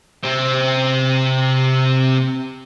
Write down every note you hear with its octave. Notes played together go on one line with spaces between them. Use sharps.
C3 C4